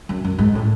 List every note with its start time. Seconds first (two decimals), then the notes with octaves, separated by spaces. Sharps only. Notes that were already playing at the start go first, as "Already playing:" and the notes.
0.09 F#2
0.24 F#2
0.39 G#2
0.55 A2